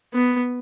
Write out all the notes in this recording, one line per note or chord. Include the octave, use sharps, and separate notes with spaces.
B3